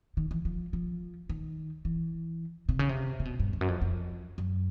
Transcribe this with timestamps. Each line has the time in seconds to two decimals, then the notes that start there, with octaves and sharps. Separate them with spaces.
0.17 D#3
0.31 E3
0.45 F3
0.73 F3
1.29 D#3
1.85 E3
2.69 C3
2.79 C#3
2.89 C3
3.20 C3
3.25 B2
3.40 G2
3.53 F2
3.61 F#2
3.68 F2
3.82 F2
4.38 F#2